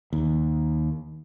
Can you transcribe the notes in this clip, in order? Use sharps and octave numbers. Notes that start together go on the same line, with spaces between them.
D#2